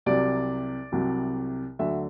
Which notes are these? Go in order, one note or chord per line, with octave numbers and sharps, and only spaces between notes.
C2 C3 F#3 D5
C2 C3 F#3
D2 D3 F#3 E5